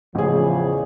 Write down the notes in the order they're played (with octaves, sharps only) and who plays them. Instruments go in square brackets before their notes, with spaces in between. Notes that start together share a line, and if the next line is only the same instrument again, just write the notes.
[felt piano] A1 G#4 [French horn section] E2 C#3 F3